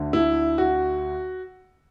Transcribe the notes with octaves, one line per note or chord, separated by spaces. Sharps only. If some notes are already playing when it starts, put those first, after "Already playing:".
Already playing: D2 D3
E4
F#4